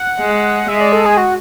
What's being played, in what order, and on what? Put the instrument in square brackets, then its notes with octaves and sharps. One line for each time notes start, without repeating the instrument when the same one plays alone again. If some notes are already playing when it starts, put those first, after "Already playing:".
Already playing: [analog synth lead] F#5
[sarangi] G#3
[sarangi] G#3 [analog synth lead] E5
[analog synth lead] D5
A4
G#4
F#4